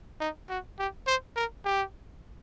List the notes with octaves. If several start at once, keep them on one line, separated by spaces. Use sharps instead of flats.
D#4
F#4
G4
C5
A#4
G4